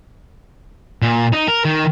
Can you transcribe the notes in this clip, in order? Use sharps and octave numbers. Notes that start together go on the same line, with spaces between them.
A#2
D#4
A#4
D#3